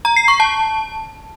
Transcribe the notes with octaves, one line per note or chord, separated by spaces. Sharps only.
A#5
C7
C#6
A5